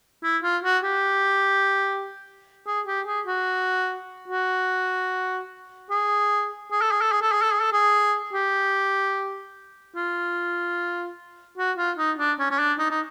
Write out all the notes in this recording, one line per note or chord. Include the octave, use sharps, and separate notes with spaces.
E4
F4
F#4
G4
G#4
G4
G#4
F#4
F#4
G#4
G#4
A4
G#4
A4
G#4
A4
G#4
A4
G#4
A4
G#4
G4
F4
F#4
F4
D#4
D4
C#4
C#4
D4
D#4
D#4